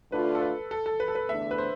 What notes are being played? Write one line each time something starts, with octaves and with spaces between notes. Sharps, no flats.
D3 A3 D4 F4 B4
A4
B4
A4
A4
B4
A4
B4
E2 D3 A3 D4 E5
B4
C5